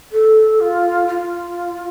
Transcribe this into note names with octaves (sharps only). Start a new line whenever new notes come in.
A4
F4
F4